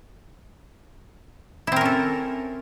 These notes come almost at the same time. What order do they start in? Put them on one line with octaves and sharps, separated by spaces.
E4 C4 A#4 C#4 A4